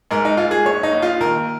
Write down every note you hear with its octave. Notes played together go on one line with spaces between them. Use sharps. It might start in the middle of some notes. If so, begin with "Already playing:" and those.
G#2 A#4
D#4
G#2 F4
G#4
A#1 C#5
D#4
A#1
F4
D#2 A#4